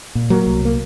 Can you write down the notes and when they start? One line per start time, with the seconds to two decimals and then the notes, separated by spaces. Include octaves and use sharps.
0.15 A#2
0.30 F#3 A#3
0.47 C2
0.65 A#3